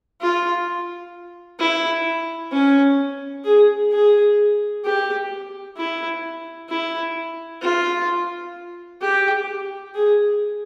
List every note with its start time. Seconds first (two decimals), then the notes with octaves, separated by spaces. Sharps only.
0.21 F4
1.59 E4
2.52 C#4
3.44 G#4
3.92 G#4
4.84 G4
5.77 E4
6.69 E4
7.62 F4
9.01 G4
9.94 G#4